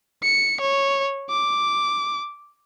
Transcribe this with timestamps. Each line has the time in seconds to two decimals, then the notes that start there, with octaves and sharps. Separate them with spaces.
0.23 C#7
0.61 C#5
1.30 D6